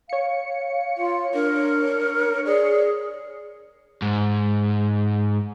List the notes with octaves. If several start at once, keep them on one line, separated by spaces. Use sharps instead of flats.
C#5 F5 C#7
F4
D4 A#4
G#4 D5
G#2